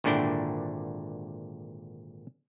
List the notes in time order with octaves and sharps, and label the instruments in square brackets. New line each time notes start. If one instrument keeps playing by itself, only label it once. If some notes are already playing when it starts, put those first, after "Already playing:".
[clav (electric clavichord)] G#1 A#2 D3 D4 E4 G5